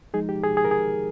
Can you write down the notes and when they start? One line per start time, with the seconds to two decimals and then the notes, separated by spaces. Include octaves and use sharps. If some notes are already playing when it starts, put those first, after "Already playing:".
0.14 F3 G#3 D#4 G#4
0.29 G4
0.43 G#4
0.57 G#4
0.65 A#4
0.71 G#4